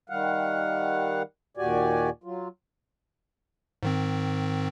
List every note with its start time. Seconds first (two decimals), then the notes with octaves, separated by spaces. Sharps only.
0.10 D#3 G3 F5 F#5
1.57 D#2 A#2 F#4 G4 D5 G#5
2.24 F#3 F4
3.83 G#2 D#3 C4